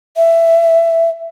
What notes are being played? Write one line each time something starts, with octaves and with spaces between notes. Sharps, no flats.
E5